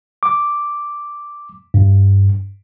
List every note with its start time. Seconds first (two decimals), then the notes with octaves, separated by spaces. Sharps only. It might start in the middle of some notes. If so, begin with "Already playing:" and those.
0.23 D6
1.74 G2